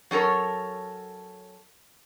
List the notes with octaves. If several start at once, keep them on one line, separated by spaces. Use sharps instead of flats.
F#3 C#4 A4 A#4 C#5